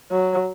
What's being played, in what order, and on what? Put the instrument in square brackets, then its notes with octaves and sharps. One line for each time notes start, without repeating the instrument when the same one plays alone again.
[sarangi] F#3